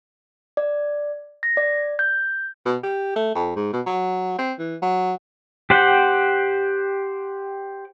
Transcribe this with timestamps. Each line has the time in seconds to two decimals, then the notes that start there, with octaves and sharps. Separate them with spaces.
0.57 D5
1.43 A#6
1.57 D5
1.99 G6
2.65 B2
2.83 G4
3.16 A3
3.35 F2
3.56 G#2
3.73 B2
3.86 F#3
4.38 C4
4.59 E3
4.82 F#3
5.70 G4 C5 F#5 G5